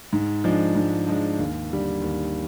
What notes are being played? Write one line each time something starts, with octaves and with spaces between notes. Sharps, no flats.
G#2
F3 G#3 D4
G#2
F3 G#3 D4
D#2
D3 G3
D#2